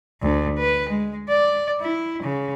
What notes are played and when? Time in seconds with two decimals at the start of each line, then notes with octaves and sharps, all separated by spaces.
0.22 D2
0.58 B4
0.89 G#3
1.28 D5
1.82 E4
2.23 C#3